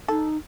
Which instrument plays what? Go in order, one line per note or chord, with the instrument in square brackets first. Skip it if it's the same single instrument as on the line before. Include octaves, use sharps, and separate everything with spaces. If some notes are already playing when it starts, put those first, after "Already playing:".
[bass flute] D#4 [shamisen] A4